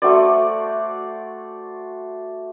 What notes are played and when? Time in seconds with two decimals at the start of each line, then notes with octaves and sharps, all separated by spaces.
0.02 A3 F#4 C5 D5